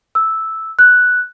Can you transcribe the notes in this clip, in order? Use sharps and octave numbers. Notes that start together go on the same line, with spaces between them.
E6
F#6